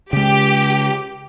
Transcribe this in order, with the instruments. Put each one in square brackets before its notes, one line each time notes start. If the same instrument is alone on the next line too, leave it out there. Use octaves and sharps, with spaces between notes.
[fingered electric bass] C#3 G#3 [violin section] G4